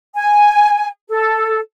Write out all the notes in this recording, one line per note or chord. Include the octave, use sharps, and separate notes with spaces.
G#5
A4